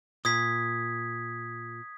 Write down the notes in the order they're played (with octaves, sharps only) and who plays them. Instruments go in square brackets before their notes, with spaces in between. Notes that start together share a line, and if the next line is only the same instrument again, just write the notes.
[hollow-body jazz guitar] A#2 [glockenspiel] D#6 G#6 B6